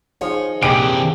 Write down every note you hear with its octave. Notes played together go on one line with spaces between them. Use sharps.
F3 D#4 G#4 C#5
A#1 C3 E3 G4 D7